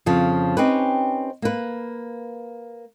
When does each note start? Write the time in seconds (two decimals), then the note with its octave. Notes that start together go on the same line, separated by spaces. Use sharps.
0.06 F2 C#3 F3
0.57 C4 C#4 D#4 G4 B4
1.42 A#3 B4